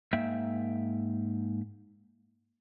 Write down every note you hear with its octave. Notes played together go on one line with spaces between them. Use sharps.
G#2 A#3 E5 G5